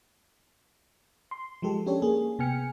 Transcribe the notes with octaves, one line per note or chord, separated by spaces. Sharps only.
C6
F3 G#3 G4 A4
C#4 D4 G4 A4 C#5
A#3 G#4
C3 B3 G5 G#5 F6 C#7